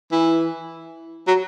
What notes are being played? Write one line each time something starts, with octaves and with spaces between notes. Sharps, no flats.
E3
F#3